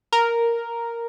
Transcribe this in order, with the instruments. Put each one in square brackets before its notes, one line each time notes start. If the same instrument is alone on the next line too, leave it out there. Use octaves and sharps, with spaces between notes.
[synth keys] A#4